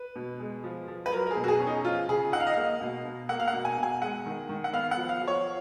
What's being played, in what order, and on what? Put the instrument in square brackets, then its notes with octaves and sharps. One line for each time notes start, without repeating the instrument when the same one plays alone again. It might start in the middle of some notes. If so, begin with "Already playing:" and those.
Already playing: [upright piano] B4
B2
G#3
F3
F3
B4
F#3 A#4
A#4
G#4
B2
F#4
G#4
C#4
D#4
F3 F4
C#3 G#4
D#4 F#5
F5
D#5
A#3 F5
B2
B2
A#3 F#5
F5
F#5
B2
G#5
B2
G#5
G#3 F#5
D#3
D#3
F#5
B3 F5
F#5
F3
F5
F3
C#5